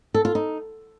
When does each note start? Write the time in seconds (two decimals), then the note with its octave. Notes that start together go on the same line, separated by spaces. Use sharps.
0.14 A4
0.25 F4
0.35 D#4